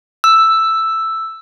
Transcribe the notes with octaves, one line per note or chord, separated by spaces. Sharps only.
E6